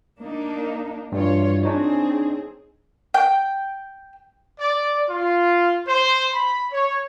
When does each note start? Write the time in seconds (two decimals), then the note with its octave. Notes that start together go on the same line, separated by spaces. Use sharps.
0.19 A#3 D4 D#4
1.12 G2 E3 G3 F4 C#5
1.63 C4 D4 D#4 G#4 C#5
3.14 G5
4.60 D5
5.10 F4
5.87 C5
6.34 B5
6.72 C#5